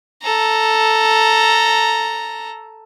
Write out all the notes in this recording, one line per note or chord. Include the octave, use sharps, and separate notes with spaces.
A4 A#5